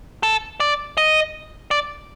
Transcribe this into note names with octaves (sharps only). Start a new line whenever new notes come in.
A4
D5
D#5
D5